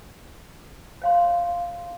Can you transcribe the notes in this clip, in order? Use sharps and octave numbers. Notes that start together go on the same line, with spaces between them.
C#5 F5 C6